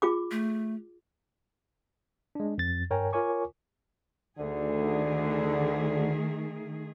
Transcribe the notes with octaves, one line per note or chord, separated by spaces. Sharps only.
F4 G#4 D6
A3
G#3 D4
F2 A6
G2 A#4 C#5 G5 G#5 A#5
F4 A#4 C#5 G#5 C#6 D6
D2 D3 D#3 A3 G#4